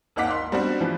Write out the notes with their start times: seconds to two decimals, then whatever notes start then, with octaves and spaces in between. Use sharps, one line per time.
0.16 G#1 D#2 D#4 F#5 D6 B6
0.31 C6
0.52 G3 B3 C4 D4 F#4
0.80 E3 F3